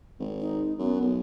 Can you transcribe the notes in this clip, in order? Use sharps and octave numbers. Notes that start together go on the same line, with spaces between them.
G#1
D#4
F#2 B3
B1